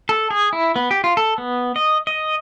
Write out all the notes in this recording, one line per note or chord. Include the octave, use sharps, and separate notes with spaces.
A4
G#4
E4
B3
G4
F4
A4
B3
D#5
D#5